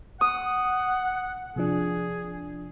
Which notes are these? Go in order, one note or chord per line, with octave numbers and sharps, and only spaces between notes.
F#5 D#6
C3 F3 D4 G#4